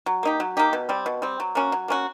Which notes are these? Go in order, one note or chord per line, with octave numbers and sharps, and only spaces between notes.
F#3
A#3 D#4 G4
F#3
A#3 D#4 G4
B2
G3 C4
B2
G3 C4
F#3
A#3 C#4 F#4
F#3
A#3 C#4 F#4